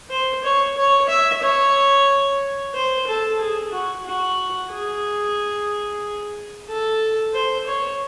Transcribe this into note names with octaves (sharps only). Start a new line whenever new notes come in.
C5
C#5
C#5
E5
C#5
C5
A4
G#4
F#4
F#4
G#4
A4
C5
C#5